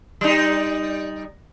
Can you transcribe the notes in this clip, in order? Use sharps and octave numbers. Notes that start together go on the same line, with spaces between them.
G3 D#4